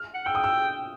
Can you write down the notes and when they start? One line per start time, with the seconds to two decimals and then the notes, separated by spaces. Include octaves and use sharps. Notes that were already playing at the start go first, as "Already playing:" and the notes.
Already playing: F6
0.14 F#5
0.26 G5 E6
0.35 D#6
0.44 E6